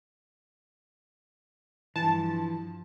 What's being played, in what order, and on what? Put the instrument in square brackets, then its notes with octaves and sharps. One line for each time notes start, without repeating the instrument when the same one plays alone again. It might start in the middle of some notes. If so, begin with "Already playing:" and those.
[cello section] G2 F3 [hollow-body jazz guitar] E3 [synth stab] A5